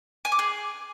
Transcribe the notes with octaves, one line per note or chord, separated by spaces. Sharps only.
G#5
D6
G#4